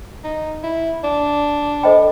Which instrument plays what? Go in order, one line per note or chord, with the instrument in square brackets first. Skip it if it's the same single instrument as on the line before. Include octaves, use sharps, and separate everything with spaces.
[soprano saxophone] D#4
E4
D4
[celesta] A4 C5 D#5 G5 B5